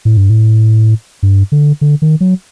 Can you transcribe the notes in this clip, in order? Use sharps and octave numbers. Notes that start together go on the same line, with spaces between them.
A2
G2
A2
G2
D3
D3
D#3
F#3